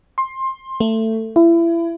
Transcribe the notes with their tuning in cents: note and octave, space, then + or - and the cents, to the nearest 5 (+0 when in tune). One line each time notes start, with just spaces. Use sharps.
C6 +20
A3 +20
E4 +30